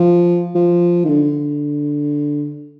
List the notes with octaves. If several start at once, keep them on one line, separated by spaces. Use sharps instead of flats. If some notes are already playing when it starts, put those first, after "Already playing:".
Already playing: F3
F3
D#3
D3